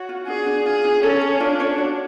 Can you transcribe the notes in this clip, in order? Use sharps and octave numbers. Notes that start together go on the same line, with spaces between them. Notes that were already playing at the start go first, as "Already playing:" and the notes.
Already playing: F#4 C#5
F4
D4 G#4
D4
F4 G#4
D4
C#4 A4
C#5
D4 F4
C#5
F#4